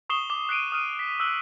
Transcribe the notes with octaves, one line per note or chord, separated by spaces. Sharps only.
C#6 D#6 C7 E7 G7
D6 G7
F#6 C7 D7 D#7
D#6 F6 D#7
B6
E6 F#6 F#7 G7